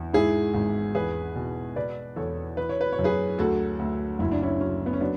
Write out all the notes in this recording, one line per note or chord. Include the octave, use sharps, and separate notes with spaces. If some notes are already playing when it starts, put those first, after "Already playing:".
Already playing: E2
G#2 E4 G#4
G#1
E2 G#4 B4
B2
B2 B4 D5
E2 A4 C#5
E3 B4
C#5
B4
C#5
F#2
G#4 B4
D2 F#4 A4
D2
F#1 E4
D4
C#4 E4
F#3 C#4
B3
C#4
F#3 B3 D4